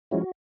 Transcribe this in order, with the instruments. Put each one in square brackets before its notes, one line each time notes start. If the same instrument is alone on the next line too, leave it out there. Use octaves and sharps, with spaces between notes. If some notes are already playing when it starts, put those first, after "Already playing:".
[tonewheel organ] F3 G#3 C#4 E4 F#4